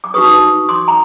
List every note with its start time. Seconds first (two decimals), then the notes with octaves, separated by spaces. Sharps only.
0.04 D6
0.14 D#4 F#4 B4 C#6 D#6
0.69 C6 D6
0.88 A#5